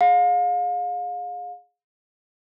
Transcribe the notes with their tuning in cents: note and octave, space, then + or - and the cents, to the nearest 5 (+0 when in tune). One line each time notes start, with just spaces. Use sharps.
G#4 +0 F5 +35